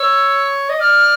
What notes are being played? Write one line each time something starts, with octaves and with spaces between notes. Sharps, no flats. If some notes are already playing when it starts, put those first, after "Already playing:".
Already playing: C#5 E6
D#5
D5 F6